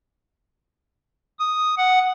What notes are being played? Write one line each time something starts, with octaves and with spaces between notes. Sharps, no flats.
D#6
F#5